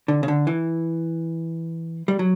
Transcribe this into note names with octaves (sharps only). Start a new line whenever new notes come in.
D3
C#3
D3
E3
G3
F#3